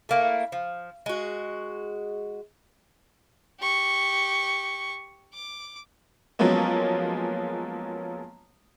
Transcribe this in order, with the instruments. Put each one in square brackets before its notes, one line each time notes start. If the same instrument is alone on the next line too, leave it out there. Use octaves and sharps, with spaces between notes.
[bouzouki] A3 A#3 E4
F3
G#3 F#4
[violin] G4 C#6
D6
[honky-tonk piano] F3 F#3 G#3 A#3 B3 C#4